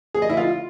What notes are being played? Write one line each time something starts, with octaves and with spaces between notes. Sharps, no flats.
G#4
D#5
E4
F4